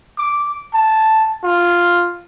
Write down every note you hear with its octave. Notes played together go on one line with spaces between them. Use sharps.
D6
A5
F4